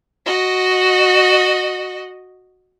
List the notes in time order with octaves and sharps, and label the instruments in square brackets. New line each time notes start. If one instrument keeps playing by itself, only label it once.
[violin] F#4 D#5